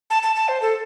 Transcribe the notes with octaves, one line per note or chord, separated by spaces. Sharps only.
A5
A5
A5
C5
A4